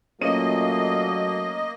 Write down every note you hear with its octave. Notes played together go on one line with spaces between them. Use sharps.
A#2 F#3 A3 A#3 C#4 D#5 D#7